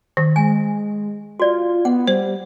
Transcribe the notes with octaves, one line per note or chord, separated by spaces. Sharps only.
D#3
G#3 G#5
F4 F#4 D5
B3 F#5
G3 C5